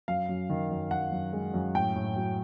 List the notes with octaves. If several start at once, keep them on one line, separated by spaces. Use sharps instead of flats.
F#2 F5
F#2
D#3
F#2
F#2 F#5
F#2
G#3
F#2
A2 G5
A2
F#3